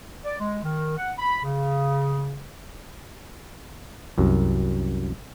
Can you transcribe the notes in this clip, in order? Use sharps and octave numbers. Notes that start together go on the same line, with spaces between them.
D5
G#3
D#3
F#5
B5
C#3
C2 F#2